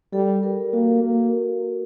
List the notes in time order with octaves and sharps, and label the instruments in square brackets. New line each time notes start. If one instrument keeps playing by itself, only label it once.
[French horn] G3 [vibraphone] A4
[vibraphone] A#4
[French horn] A#3 [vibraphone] F#4
[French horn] A#3